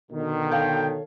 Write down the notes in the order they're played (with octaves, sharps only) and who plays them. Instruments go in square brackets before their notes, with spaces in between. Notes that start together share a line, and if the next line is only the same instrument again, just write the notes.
[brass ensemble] B2 D3 D#3
[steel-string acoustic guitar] A4 C#5 F5 [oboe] G5